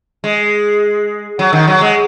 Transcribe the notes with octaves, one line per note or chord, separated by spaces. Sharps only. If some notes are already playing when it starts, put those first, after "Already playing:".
G#3
F#3
D#3
F#3
G#3